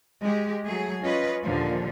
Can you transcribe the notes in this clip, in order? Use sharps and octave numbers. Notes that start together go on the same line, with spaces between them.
G#3 G4
F#3 A3 G#4
C#4 F4 B4 D#5
D#2 A#2 D3 F3